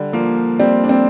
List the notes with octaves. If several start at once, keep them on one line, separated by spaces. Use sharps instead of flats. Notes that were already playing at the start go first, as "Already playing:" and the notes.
Already playing: D3 G3
F3 A#3
G3 C4
D4
G3 C4